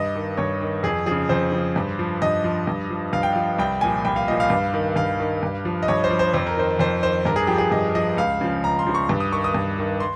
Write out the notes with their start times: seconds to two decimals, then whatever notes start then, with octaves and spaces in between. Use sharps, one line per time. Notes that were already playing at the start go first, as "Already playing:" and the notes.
Already playing: G2 D#5
0.15 D#3
0.37 G2 C#5
0.61 D#3
0.83 F2 G#4
1.06 C#3 F3 G#4
1.29 F2 C5
1.52 C#3 F3
1.76 G2
1.99 F3
2.22 G2 D#5
2.44 F3
2.67 G2
2.90 F3
3.13 G2 F5
3.23 G5
3.33 F3 F5
3.59 C2 G5
3.81 A#2 F3 G#5
4.05 C2 G5
4.16 F5
4.28 A#2 F3 D#5
4.40 F5
4.50 G2
4.74 D#3
4.96 G2 F5
5.20 D#3
5.43 G2
5.65 F3
5.83 D#5
5.88 G2 C#5
6.04 C5
6.11 F3
6.19 C5
6.33 F2 C5
6.47 A#4
6.57 D#3 C5
6.79 F2 C5
7.03 D#3 C5
7.25 G2 A#4
7.36 G#4
7.47 F3 G4
7.58 G#4
7.71 G2 D#5
7.95 F3 D#5
8.17 C#2 F5
8.41 C#3 F3
8.63 C#2 A#5
8.79 C6
8.87 C#3 F3
8.95 C#6
9.09 G2
9.20 D#6
9.32 D#3 C#6
9.44 D#6
9.54 G2
9.79 D#3
10.00 C6